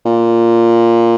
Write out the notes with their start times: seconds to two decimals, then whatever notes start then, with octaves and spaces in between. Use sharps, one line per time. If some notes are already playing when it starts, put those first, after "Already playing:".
0.05 A#2